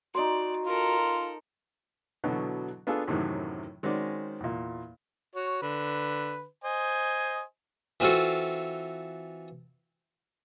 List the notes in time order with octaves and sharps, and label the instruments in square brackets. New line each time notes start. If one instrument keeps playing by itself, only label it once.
[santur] D#4 C6 [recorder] F#4 [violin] D5
[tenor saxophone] F4 [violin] A4 A#4
[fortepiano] B2 D3 E3 F#3 B3 F#4
B3 D4 F4 G#4 A4
F#2 A2 C3 D#3 E3 F#3
D#3 G#3 C4 C#4 F#4 D5
E2 A#2
[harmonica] F#4 C#5
D3 B4
C5 D#5 G#5
[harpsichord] E3 C4 F4 F#4 A4